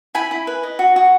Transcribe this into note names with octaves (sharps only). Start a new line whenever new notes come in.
E4 G#5 B5
E4
B4
D#5
F#4
F#4